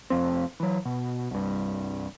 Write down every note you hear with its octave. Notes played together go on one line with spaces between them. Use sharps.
F1 F2 C4
E3 F#3
B2
C2 G2